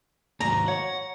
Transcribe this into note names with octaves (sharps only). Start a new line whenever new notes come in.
D#2 G#2 F#4 A#5
C#5 F#5